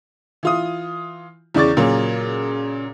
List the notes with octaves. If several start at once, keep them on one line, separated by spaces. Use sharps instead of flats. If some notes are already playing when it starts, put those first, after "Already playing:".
E3 F4 D#6
E2 C#3 D5 C#6 A6
A#2 C#3 F#3 A#3